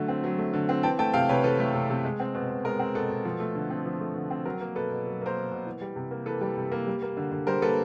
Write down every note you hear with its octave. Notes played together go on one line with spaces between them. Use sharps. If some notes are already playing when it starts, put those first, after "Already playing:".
Already playing: D3 F#3 A3
C4
F#3
A3
D3
C4
E3 G5 A5
A3 G5 A5
C3 F5 G5
C3 B4 C#5
E3 A4 B4
A3
C3
C3
G#3
C4
B2
B2
G#3 A#4
C4
B2 A4
B2
F3
A3
D3
C4
F3
A3
D3
C4
F#3 A#4
A#3
B2 A4 B4
B2
F#3
A#3 A#4 C5
B2
B2
E3
G3
C3
A#3
E3 A4 B4
G3
C3
A#3
G3
A#3
D3
D3
G3 A#4 C5
A#3 A4 B4